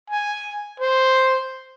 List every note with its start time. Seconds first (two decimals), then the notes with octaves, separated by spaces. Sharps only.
0.10 G#5
0.80 C5